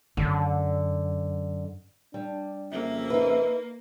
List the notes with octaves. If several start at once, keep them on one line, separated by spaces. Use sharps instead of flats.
F#2 D3
G3 D4
F2 C#3 A#3 C4 E5
D#4 B4